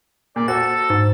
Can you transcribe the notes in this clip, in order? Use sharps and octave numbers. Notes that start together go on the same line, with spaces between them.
A#2 D5
F#4 A4 C5 A6
G#2